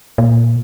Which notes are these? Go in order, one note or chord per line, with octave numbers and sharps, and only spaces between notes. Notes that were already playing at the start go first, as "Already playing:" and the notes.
A#2